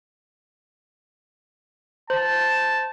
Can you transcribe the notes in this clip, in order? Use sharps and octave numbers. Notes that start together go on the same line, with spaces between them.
C5 A5